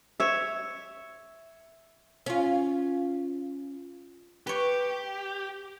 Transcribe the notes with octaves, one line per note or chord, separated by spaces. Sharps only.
C#5 E5
C#4 F4
G4 B4 C#5